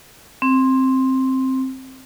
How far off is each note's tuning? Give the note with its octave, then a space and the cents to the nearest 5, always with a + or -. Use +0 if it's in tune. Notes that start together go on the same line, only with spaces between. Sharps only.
C4 +5